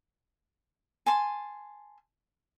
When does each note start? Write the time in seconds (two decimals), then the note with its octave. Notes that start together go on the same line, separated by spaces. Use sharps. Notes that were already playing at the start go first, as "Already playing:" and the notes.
1.06 G#5 A5 C6